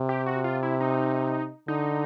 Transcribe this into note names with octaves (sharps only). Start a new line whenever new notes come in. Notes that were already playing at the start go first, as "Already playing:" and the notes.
Already playing: C3
G4
F#4
F4
E4
D#4
D3 D#4